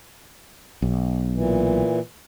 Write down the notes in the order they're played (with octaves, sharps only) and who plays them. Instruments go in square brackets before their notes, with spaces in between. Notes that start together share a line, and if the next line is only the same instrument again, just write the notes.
[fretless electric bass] B1
[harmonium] A#2 E3